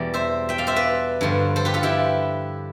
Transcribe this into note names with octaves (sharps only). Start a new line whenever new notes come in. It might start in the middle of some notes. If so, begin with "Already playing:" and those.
Already playing: E2 B2 G3 D5 G5
C5 E5
E5 G5
D5 F5
C5 E5
B4 D5
G2 D3 F3
A4 C5
G4 B4
F4 A4
E4 G4